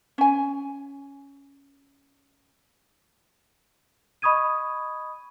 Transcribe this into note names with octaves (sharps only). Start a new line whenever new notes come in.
C#4 G#5
D#5 B5 C#6 D#6 G#6 D#7